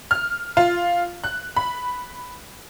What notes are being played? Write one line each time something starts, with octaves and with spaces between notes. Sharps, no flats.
F6
F4
F#6
B5